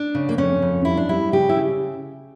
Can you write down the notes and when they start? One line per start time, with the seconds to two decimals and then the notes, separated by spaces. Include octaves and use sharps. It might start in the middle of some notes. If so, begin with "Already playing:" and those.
Already playing: D4
0.15 C#3
0.29 A#3
0.38 F2 C#4
0.62 F2
0.85 G3 E4
0.97 D4
1.09 G3 E4
1.32 C#3 G4
1.49 E4
1.56 C#3